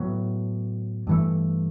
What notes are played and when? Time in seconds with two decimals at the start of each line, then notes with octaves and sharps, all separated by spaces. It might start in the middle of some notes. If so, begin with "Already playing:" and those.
Already playing: A2 F#3 B3
1.07 G2 E3 A3